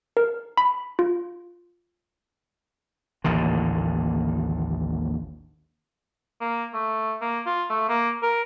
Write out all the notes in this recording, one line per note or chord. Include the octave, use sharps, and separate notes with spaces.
A#4
B5
F4
A1 D#2 A#2 D3
A#3
A3
A#3
F4
A3
A#3
A#4